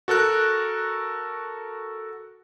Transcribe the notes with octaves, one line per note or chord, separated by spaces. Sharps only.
F#4 A4 A#4 F#6